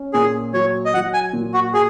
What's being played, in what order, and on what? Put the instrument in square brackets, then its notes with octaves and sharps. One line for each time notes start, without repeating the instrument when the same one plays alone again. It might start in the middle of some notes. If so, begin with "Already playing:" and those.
Already playing: [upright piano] C#4
[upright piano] A#2 [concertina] G#4
[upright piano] F#3 [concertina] C#5
[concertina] D#5
[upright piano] F#3 [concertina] F#5
[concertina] G#5
[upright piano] A#2
[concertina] F#4
[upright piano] F#4 [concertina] G#4